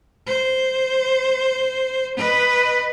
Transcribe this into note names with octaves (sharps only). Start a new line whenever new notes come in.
C5
B4 D#5